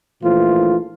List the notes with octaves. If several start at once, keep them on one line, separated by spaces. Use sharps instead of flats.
A#1 A#2 E3 A3 F4 C5